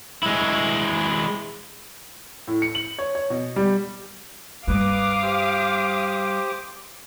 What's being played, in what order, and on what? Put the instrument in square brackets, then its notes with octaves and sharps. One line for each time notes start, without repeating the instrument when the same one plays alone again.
[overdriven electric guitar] G#3 E4
[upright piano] A2
C#7
F#7
C#5
C#5
B2
G3
[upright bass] G2 G3 [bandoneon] B4 [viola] F5 [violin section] D6 D#6
[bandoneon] G4 C5